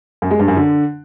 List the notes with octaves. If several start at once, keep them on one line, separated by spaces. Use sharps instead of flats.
F#2
G#3
G2
F#2
D3